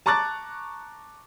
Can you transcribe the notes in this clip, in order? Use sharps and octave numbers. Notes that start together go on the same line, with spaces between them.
A5 A#5 C#6 D6 F#6 A6